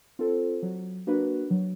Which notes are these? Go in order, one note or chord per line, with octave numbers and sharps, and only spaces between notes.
C4 F4 A4 C5
F#3
A#3 D4 F#4 B4
F#3